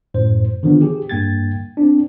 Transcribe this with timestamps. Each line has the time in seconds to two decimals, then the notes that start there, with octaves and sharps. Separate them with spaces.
0.14 F#2 A2 C5
0.63 D3 D#3 F3 B3 D4
0.82 G4 G#4
1.09 G2 A#3 G5 G#6 A6
1.77 C4 D4